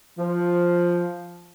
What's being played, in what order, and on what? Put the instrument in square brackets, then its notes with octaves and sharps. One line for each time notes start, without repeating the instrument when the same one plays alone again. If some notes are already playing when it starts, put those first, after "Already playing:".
[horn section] F3